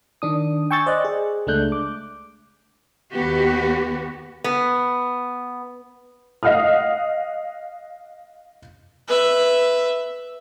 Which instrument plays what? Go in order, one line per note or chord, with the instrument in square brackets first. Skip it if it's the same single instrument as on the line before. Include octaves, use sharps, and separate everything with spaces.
[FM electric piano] D#3 D4 D#6
G5 G#5 C#6 E6 G6 A6
C5 D5 D#5 F#6
G#4
C#2 G#3 A3 D4 F#6 G6
D6
[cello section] D#2 B3 F#4 G4 B4
[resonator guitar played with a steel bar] B3
[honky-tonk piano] D#5 F5 F#5 D#6 F6
[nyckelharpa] B4 E5